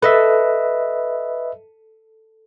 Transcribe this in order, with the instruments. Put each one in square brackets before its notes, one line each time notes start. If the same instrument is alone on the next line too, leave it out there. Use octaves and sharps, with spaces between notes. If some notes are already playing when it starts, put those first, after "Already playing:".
[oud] A4 [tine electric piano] B4 D#5 E5